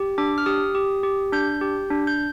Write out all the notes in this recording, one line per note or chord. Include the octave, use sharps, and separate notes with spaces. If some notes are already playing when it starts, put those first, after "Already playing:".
Already playing: G4
D4 D6
F6
G4 D#6
G4
G4
D4 G6
G4
D4
G6